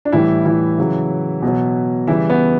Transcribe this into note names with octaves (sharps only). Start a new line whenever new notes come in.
D4
A2 E3 G3 E4
E3 E4
C#3 F#3
B2 F#3
C#3 E3 G3 E4
B3